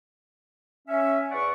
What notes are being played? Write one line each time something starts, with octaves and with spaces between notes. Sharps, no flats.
C#4 E5
E2 D5 F#5 C#6